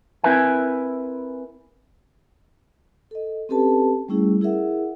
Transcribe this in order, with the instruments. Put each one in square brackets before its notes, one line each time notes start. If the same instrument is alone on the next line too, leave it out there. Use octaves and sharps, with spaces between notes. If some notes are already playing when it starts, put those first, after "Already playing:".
[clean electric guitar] C4 E4 A#4 B4 E5 G#5
[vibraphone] A4 D#5
C4 C#4 G4 A4 B4 A5
G3 A3 C#4 E4 G#4
E4 G#4 A#4 E5 F#5